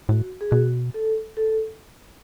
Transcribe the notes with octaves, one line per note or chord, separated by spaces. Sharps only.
A2 F#4
G#4
B2 F#4
A4
A4